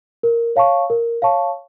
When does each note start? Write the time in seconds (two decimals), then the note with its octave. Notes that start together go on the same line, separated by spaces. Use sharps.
0.23 A#4
0.56 C#5 F5 A5 C#6
0.90 A#4
1.22 C#5 F5 A5 C#6